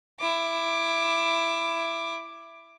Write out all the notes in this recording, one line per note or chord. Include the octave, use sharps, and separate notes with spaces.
E4 D6